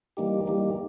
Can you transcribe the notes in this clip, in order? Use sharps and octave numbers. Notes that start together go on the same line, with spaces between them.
E3 G3 A#3 D#4 G4
E3 G3 A#3 D#4 G4